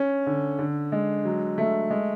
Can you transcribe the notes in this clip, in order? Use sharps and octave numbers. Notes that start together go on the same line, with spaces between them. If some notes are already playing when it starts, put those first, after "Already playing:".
Already playing: C#4
D3
D3
G#3
F#3
A3
G#3